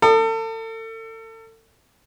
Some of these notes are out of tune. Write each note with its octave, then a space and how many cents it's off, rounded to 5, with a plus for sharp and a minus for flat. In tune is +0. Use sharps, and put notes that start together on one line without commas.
A4 +35 D#6 -30